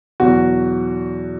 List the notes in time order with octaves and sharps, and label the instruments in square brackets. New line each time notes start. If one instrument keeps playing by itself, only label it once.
[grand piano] E2 B2 F#3 F#4